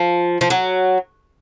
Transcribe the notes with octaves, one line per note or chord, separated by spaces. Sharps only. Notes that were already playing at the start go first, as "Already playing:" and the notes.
Already playing: F3
F3
F#3